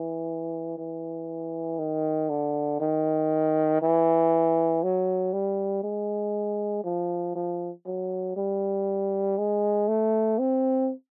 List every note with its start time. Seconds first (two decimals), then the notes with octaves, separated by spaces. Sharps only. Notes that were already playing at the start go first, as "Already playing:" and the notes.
Already playing: E3
0.78 E3
1.79 D#3
2.30 D3
2.80 D#3
3.82 E3
4.83 F#3
5.33 G3
5.83 G#3
6.84 F3
7.35 F3
7.86 F#3
8.36 G3
9.38 G#3
9.88 A3
10.39 C4